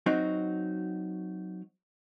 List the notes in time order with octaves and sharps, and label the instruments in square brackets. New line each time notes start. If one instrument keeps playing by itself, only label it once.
[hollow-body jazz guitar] F#3 C4 D#4 F#4